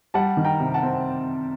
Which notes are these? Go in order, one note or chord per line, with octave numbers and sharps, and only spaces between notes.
G3 F#5 A5
D#3
G5 A#5
C3
F#5 A5
C4